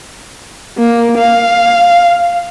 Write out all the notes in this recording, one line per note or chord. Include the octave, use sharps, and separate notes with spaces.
A#3
F5